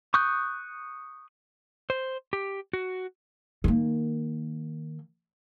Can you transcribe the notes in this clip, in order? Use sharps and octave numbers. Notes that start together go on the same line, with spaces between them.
C#6 D#6 F#6 G6
C5
G4
F#4
D#3 A#3